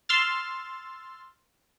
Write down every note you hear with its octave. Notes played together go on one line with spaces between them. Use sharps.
C6 E6 F6 A6